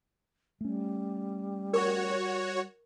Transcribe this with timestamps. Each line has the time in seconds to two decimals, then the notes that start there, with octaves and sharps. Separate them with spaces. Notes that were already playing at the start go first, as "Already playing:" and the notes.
0.61 G3 A3 C#4
1.73 F#4 A#4 C#5 C#6